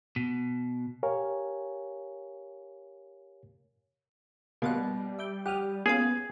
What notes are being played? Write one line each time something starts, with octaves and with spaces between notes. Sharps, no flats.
B2
G4 A#4 C#5 F5 G#5
B2 G3 A#3 F4 F#5
E5 D6 G6
G4 F#5 D#6 F6
A#3 B3 C#4 F4 G#4